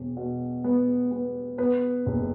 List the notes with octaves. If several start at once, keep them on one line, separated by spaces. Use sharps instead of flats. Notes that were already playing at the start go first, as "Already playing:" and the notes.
Already playing: E1
B2
B3
B3
B3 B4
F#1